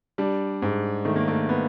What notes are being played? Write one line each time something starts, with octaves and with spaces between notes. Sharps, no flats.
G3 D4
G#2
D#3 A3
A#3
A3
B3